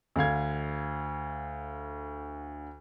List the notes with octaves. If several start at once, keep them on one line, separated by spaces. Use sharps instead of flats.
D2 D3 F5 G#6